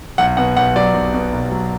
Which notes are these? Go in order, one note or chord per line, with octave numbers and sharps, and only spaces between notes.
B1 F#5
B2 F#5
B1 F#5
F#3 D5
B1
B2
B1
F#3